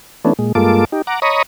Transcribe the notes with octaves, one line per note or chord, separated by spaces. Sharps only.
E3 A3 B3 C#4 D4
A#2 G#3
G2 G#3 A#3 F4 A4 D6
D#4 G4
F#5 A#5 D6
C#5 D#5 A#5 B5 C#6 D#6